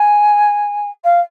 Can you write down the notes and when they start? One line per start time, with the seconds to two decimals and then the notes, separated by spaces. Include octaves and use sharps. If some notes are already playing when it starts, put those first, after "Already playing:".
Already playing: G#5
1.04 F5